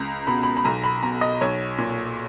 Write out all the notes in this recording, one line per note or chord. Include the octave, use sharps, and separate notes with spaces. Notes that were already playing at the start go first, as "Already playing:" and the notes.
Already playing: C#2 A#5
B2 B5
B5
B5
B1 A#5
B5
B2 A#5
D#5
B1 C#5
A#2